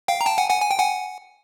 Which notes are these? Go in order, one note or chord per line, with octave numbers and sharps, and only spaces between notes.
F5 G5
A#5
G5 A5
F#5 G#5
F#5 G#5
G#5
G5
F#5 G#5